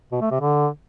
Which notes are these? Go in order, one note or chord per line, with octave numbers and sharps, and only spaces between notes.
B2
A3
C3
D3